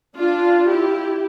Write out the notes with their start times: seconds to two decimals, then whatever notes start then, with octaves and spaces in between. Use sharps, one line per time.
0.16 D4 F4
0.68 E4 G4